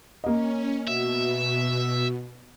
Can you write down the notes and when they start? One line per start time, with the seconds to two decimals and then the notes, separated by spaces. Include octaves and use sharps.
0.24 A#3 C#4 D#5
0.88 B2 F#4 E5